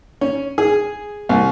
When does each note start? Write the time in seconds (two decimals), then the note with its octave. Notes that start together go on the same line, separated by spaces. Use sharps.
0.21 C#4
0.58 G#4
1.29 C2